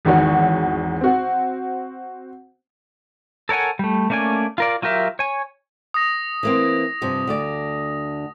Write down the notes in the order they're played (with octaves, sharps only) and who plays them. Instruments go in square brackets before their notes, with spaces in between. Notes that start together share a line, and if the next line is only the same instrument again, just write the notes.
[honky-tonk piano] G#1 E2 D#4 F#4 C#5
C4 F#4
[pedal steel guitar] A4 A#4 C#5 F#5 G#5
G3 A3
A3 A#3 C#4 D5 G#5
F4 A#4 D5
F#3 F4 G4 A#4 E5
C#5 G#5
[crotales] D#6 A#6
[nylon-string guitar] E3 A#3 C4
G2 C3 F3
D2 D3 D5